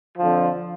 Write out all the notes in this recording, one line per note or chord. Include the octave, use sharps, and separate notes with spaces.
F2 D3 F3